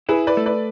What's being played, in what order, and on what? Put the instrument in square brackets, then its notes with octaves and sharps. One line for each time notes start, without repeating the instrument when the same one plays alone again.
[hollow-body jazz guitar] E4 [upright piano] G#4 B4
[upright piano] B4 D5
[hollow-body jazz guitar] A3
[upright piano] B4 D5